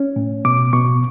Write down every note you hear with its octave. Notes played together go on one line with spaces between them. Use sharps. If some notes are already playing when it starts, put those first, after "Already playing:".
Already playing: C#4
A2
B2 D6
B2 C#6